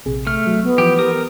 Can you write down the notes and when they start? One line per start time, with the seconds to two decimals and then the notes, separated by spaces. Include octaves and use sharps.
0.06 A#1 C3 G#4
0.27 A3 F6
0.46 F#3
0.62 B3
0.78 E3 F3 G4
0.99 G4 A#4 D#6